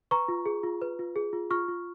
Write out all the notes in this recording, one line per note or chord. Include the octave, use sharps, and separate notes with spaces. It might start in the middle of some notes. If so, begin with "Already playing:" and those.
B4 A#5 C#6
F4
G#4
F4
B4
F4
G#4
F4
F4 C#6 F6
F4